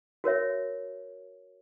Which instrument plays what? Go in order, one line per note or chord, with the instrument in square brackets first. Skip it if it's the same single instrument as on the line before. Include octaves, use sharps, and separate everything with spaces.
[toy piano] F#4 A#4 C#5 E5